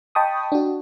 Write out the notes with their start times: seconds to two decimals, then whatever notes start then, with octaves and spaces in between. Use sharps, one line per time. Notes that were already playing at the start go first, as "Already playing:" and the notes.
0.15 D#5 G5 A5 B5 C#6 D#6
0.52 D4 F#4